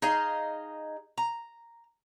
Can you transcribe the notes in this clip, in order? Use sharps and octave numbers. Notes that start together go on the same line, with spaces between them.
D#4 G#4 D#5 F5
A#5